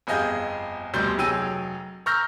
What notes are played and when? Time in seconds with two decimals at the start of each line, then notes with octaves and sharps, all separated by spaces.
0.07 G1 F2 G#4 D#5 F5 G6
0.94 F1 D2 B2 G3 C6 G6
1.18 F1 F#3 G#4 G5 E6 D#7
2.06 A#5 C#6 E6 F6 G6 A#6